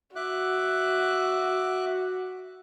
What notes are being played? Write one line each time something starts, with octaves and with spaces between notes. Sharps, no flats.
F#4 E5 D6 F#6